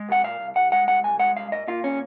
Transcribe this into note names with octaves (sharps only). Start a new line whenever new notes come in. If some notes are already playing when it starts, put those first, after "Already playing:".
Already playing: G#3
C2 F#5
A#2 F5
C2
C2 F#5
G#3 F#5
C2 F#5
C2 G#5
G#3 F#5
C2 F5
A#2 D#5
A#2 F4
C#4